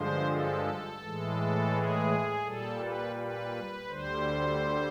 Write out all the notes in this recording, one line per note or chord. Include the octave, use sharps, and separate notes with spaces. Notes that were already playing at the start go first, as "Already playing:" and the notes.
Already playing: G2 D3 F3 G#3 C5
A4
A2 E3 G#3
G#4
A#2 G3 A4
B4
B4
D2 D3 G3 C5